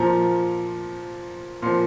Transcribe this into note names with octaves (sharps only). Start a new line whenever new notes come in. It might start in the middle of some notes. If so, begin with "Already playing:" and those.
Already playing: A#2 F3 A#5
A#2 F3 C6